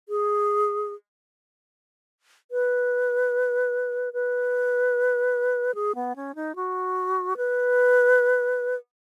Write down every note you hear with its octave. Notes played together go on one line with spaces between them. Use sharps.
G#4
B4
B4
G#4
B3
C#4
D#4
F#4
B4